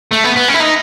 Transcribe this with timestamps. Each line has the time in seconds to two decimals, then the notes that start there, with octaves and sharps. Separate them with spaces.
0.13 A3
0.25 B3
0.37 B3
0.49 C#4
0.55 E4
0.61 D#4